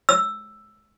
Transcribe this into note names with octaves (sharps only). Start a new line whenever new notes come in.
E6